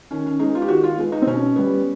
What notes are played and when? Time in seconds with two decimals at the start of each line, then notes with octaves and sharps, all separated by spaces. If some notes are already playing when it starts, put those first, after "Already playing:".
0.11 D#3 C#4
0.26 C#4
0.39 G#3 B3 D#4
0.55 F4
0.62 G4
0.68 D#3 F#4
0.84 F4
0.98 G#3 B3
1.12 D#4
1.22 C4
1.26 B2 C#4
1.56 G3 B3